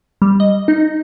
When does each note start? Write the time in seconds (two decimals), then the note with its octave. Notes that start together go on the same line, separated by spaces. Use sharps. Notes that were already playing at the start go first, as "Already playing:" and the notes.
0.22 G3
0.40 D#5
0.68 D#4